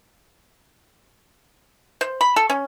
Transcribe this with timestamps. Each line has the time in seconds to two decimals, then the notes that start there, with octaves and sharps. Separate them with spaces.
2.01 C5
2.21 B5
2.36 A4
2.50 C#4